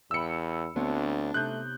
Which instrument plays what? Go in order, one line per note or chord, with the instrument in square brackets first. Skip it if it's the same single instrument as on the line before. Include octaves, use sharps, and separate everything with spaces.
[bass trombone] E2 [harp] E5 G5 B5 [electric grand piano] E6 C#7
[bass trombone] D2 [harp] B3 C4 C#5 [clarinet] D4
[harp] C3 D#4 [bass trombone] A3 [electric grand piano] F#6 G6